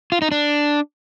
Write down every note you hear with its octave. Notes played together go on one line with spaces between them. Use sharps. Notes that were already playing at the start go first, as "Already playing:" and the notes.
F4
D#4
D4